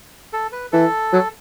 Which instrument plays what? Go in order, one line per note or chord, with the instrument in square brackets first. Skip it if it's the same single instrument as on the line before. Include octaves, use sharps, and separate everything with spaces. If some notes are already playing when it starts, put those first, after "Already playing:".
[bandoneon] A4
B4
[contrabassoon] E3 [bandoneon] A4
[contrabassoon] F#3